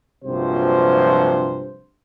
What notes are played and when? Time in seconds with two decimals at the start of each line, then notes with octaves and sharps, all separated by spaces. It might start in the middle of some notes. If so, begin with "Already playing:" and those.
0.25 A#1 G2 C3 F3 F#3 C5